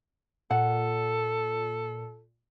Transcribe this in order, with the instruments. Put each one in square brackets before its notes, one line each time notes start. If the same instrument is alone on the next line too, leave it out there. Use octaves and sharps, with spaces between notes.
[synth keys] A#2 [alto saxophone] A4 [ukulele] F#5